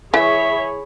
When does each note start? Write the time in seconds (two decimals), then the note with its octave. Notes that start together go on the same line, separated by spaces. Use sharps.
0.14 E3 G#4 C#5 E5 B5